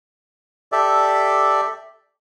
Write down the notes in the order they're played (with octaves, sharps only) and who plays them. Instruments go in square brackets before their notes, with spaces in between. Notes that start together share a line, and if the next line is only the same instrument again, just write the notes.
[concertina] G4 A4 D5 E5